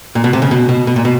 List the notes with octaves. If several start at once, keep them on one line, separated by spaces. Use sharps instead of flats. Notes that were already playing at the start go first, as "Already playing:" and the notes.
A#2
B2
C3
C#3
B2
B2
B2
A#2
B2